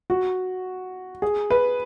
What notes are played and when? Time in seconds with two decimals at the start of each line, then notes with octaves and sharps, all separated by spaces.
0.10 F#4
1.22 G#4
1.50 B4